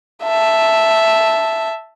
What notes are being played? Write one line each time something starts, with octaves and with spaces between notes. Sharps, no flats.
E5 A5